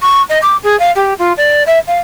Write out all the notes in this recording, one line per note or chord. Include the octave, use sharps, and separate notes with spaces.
C#6
D#5
D6
G#4
F5
G4
F4
D5
E5
F5